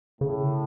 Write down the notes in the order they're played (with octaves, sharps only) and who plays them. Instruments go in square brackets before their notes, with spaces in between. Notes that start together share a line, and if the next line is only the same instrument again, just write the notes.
[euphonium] A2 [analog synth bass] C#3